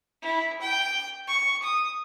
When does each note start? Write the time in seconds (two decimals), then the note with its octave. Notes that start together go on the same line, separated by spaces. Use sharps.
0.22 E4
0.61 G5
1.27 C#6
1.62 D#6